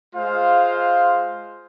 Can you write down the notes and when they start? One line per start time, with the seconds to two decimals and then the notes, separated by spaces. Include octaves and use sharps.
0.15 G#3 F4 C5 F5